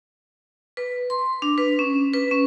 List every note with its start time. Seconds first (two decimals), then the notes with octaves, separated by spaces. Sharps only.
0.77 B4
1.10 C6
1.42 D4
1.58 B4
1.79 C#4
2.14 B4
2.31 C#4